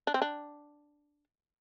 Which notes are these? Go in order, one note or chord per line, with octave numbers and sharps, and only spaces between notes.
D4
C4
D4